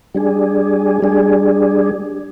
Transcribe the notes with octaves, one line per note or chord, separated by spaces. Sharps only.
G3 D4 G#4
G3 D4 G#4